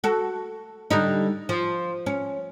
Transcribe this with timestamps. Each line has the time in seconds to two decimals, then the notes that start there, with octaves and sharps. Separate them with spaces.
0.04 F#4 A4
0.91 D3 G3 D#4
1.49 F3
2.06 C#4